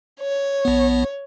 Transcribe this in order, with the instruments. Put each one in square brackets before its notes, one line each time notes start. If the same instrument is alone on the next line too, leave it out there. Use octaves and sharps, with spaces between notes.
[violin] C#5
[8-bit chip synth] A#1 B3